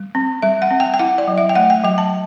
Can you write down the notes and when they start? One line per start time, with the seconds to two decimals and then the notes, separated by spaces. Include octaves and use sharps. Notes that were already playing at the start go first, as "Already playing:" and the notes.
Already playing: G3
0.15 C4
0.42 G3 E5
0.62 F#5
0.71 C4
0.80 G5
0.94 G5
0.99 E4 F#5
1.18 D5
1.28 F#3
1.38 E5
1.49 G5
1.55 A3 F#5
1.70 G5
1.84 F#3 G5
1.98 A5